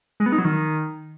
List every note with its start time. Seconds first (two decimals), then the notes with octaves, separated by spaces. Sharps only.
0.20 G#3
0.26 B3
0.32 D#4
0.39 F#3
0.45 D#3